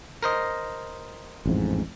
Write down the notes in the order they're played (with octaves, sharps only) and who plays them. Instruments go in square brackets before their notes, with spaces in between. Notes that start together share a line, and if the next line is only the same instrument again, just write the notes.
[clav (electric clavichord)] A#4 C5 D#5
[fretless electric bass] A1 F2 G#2